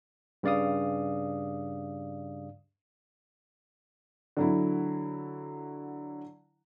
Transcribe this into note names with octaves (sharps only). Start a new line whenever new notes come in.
G2 C#3 D5 F5 D#6
D3 F#3 E4